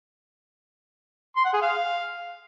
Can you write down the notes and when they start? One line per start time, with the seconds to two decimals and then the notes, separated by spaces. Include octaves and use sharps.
1.36 C6
1.45 F#5
1.53 G#4
1.62 F5